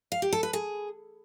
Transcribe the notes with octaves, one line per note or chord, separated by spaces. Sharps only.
F5
G4
A4
B4
G#4